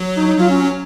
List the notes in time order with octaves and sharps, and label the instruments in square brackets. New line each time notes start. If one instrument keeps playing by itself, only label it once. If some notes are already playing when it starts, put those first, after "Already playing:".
Already playing: [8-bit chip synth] F#3
[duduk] D#4
D#4
[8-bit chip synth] F#3 [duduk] F4
[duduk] C#4
C#4